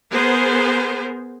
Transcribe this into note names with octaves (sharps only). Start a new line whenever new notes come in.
B3 G#4 A#4 C5